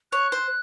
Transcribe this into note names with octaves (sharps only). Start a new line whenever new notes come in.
C#5 F#6
C5